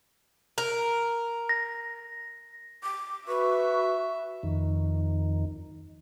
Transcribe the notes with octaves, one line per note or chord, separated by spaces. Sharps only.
A#4
A#6
D6
F#4 B4 E5 C#6
F2 D#3